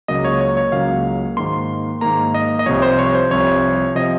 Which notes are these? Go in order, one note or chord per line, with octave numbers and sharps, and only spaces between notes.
C#2 C#3 F#3 A#3 D#5
C#5
C#5
C#5
C#2 C#3 F#3 A#3 F5
G#2 D#3 A#3 C6
G#2 D#3 A#3 A#5
D#5
D#5
C2 C3 F3 C#5
C5
C#5
C5
C2 C3 F3 C#5
C3 F3 D#5